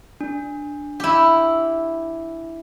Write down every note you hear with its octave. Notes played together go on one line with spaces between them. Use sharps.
D4
E4 G4